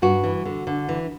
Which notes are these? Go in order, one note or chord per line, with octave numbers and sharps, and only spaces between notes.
G2 F#4
E3
D3
D3
E3